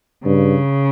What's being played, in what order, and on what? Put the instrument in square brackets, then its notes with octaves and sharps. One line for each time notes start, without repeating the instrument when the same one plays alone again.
[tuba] G2 [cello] C#3